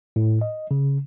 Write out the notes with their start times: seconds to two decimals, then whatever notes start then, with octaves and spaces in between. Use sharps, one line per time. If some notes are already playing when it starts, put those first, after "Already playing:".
0.16 A2
0.41 D#5
0.71 C#3